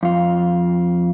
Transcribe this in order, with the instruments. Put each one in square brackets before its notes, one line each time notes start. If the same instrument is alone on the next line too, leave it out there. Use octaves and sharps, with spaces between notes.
[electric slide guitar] F2 F4